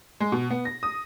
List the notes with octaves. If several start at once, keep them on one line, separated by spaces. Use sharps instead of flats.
G#3
B2
B3
A#6
D#6